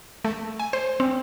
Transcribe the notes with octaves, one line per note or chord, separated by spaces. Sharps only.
A3
G#5
C5
C4